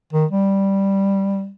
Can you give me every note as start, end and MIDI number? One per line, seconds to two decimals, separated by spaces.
0.13 0.26 51
0.31 1.51 55